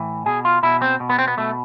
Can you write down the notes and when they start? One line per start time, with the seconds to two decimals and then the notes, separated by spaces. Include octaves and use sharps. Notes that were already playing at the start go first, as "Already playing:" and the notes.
Already playing: A2 E3
0.26 B2 G#4
0.45 F4
0.63 B2 E4
0.82 C4
1.00 B2
1.09 B3
1.19 C4
1.28 B3
1.37 B2 A3